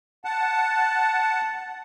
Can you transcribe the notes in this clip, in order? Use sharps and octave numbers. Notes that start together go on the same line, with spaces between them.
F#5 A5